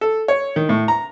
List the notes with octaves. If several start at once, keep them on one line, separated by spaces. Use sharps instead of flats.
A4
C#5
D#3
A2
A#5